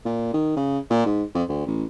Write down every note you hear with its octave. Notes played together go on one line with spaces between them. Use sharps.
A#2
D#3
C#3
A#2
G#2
F2
D2
A1